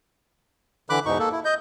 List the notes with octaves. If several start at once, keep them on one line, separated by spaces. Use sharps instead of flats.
D3 E3 B5 D6 F#6
E2 G#2 B2 D#4 C#6
A#3 A4
E4
D#5 G6